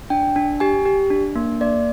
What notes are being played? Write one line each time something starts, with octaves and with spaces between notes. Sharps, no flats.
D4 G5
D4
G4 G#5
G4
D4
A#3
A#3 D5